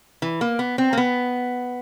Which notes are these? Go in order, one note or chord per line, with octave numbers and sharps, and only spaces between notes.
E3
A#3
B3
C4
A#3
B3